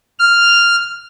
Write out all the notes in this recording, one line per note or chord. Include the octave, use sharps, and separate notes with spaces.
F6